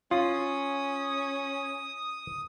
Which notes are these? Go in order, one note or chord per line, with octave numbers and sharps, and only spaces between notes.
C#4 F4 D#6